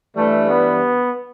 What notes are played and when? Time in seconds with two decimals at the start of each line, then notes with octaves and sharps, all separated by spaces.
0.15 G2 E3 G3 A3
0.49 B3